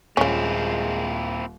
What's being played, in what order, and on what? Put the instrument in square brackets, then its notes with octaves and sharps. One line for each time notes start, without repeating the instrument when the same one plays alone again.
[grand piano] D#1 [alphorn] G#3 [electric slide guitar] A#3 C4 E4 [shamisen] C#4 F4